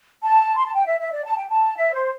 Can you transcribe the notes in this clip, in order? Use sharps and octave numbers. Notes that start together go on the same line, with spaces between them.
A5
C6
A5
G5
E5
E5
D5
A5
G5
A5
E5
C5